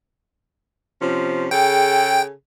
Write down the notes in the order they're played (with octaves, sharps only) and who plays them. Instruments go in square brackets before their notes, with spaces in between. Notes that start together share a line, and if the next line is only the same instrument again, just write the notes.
[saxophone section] C3 F3 C#4
[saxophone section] C#3 G#4 A4 [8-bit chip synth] G5